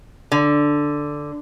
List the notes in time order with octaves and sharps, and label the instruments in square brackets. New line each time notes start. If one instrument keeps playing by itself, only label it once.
[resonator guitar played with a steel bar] D3